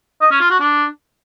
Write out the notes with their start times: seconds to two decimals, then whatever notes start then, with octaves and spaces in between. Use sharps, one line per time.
0.21 D#5
0.31 C#4
0.41 F4
0.50 F#4
0.60 D4